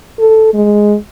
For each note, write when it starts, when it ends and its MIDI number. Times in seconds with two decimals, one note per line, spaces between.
0.19 0.50 69
0.54 0.97 56